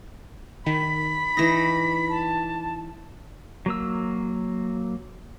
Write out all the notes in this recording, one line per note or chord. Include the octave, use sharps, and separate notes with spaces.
D#3 B5 B6
E3 D#4 A#6
A5
F#3 A#3 E6